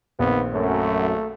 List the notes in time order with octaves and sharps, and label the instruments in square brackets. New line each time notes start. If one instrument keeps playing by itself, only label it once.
[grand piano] A#1 D#3 C4 [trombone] B3
[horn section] F#2 [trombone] A3